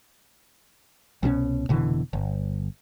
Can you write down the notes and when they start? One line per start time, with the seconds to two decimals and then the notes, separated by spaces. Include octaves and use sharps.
1.23 C2 B2 F3 C#4
1.69 F1 B2 D3 E3
2.13 G1